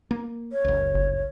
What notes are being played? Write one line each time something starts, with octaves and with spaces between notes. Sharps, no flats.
A#3
C#5
F#1 C#2
G1